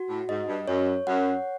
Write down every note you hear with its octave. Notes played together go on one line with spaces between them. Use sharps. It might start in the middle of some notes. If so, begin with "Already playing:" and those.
Already playing: F#4
A2
G#2 D#5
G2
F#2 C#5
F#2 F#5